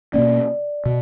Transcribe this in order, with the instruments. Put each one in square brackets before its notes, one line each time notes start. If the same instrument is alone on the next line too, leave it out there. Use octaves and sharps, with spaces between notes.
[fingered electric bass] B2 A#3 C#4 [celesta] D5
[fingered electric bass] B2